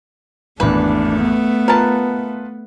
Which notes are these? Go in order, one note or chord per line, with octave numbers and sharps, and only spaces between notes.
G#1 E2 A3 D4 B4
B3
F4 A#4 B4 A5